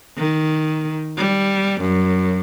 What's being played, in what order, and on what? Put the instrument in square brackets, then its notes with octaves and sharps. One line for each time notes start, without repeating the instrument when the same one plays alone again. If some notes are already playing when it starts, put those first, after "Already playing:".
[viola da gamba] D#3
G3
F#2